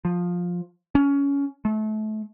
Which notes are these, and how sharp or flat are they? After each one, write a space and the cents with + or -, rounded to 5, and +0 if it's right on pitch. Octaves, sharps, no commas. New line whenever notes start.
F3 +15
C#4 +20
A3 -30